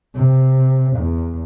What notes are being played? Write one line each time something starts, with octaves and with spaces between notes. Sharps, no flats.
C3
E2